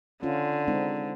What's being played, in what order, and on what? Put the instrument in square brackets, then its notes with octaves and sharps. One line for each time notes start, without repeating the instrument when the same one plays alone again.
[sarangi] D3 [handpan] C#4 F4
[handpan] G#3 C4 D#4